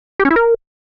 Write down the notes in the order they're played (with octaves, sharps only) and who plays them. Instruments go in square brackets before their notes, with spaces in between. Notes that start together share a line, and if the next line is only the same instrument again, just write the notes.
[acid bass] G4
C#4
E4
A#4